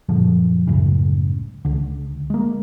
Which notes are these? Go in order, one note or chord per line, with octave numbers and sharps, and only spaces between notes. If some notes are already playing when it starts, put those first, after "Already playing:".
F#2 A#2 D3 F3
C#2 F#2 A2 C#3
C#2 D3
G#3 A#3